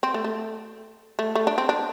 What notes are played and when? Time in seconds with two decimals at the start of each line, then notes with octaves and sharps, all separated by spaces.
0.03 C4
0.14 A3
0.24 A3
1.19 A3
1.35 A3
1.47 D4
1.58 C4
1.69 D4